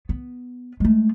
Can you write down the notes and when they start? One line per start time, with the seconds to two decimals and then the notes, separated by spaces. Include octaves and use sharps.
0.09 B3
0.80 G#3 A3